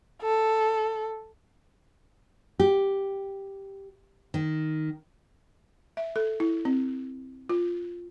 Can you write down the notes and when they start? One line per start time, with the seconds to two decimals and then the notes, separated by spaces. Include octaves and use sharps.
0.22 A4
2.59 G4
4.34 D#3
5.97 E5
6.16 A4
6.40 E4
6.65 C4
7.49 F4